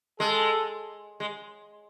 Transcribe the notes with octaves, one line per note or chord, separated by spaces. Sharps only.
G#3 A4
G#3